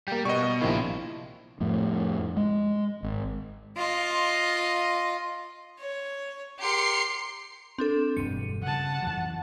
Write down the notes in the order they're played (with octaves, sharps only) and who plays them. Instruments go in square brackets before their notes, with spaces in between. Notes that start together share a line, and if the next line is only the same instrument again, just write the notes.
[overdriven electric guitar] G3 [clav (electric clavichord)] A#3 G5
[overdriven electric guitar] B2 [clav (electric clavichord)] G3 B3 [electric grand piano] D#5 C#6
[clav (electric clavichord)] F5
[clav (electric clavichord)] A#1 C3 D#3 [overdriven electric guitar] D4 F4 [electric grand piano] E4
[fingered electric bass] F2 A2
G#3
G#1
[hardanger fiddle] F4 D#5
[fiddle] C#5
[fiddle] G4 A#4 [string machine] C6 C7 C#7
[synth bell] C4 D4 A4
[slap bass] E1 G2 G3 [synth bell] C#7 D#7
[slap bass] C#3 [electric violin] F#5 A5
[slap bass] F2 E3 F#3